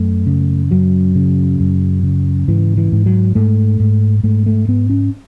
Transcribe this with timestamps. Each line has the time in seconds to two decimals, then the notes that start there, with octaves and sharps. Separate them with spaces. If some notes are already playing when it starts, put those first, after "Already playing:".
Already playing: F#2 A3
0.26 C#3
0.71 F#2 F#3
1.15 C#3
1.60 F#2
2.03 C#3
2.48 G#2 E3
2.77 E3
2.92 G#2
3.06 F#3
3.35 G#2 A3
3.80 G#2
4.23 G#2 A3
4.46 A3
4.68 G#2 B3
4.90 C#4